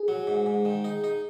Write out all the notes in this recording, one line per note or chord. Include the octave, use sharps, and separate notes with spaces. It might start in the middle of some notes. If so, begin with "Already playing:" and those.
Already playing: G#4
F#3
G#2
G#2
D#3
D#4
D#4